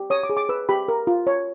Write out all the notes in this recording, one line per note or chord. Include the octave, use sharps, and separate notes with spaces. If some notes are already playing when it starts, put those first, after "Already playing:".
Already playing: G4
C#5 D#6
D6
G#4
D6
B4 E6
G4 B5
A#4
F4
C#5